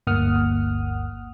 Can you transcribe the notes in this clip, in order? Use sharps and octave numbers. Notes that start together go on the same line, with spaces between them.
G1 D2 A#3 F#5 D#6 F6